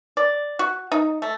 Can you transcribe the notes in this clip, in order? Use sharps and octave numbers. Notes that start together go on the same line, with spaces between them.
D5
F#4
D#4
A3